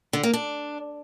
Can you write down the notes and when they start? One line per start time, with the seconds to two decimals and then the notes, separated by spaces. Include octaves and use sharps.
0.13 D3
0.23 A#3
0.33 D4